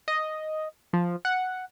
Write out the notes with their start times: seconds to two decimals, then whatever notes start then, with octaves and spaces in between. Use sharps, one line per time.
0.08 D#5
0.93 F3
1.25 F#5